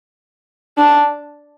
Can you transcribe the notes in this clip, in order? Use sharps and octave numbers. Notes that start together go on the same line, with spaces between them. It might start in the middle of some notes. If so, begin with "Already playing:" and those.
D4